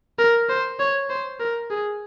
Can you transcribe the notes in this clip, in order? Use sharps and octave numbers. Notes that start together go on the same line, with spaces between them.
A#4
C5
C#5
C5
A#4
G#4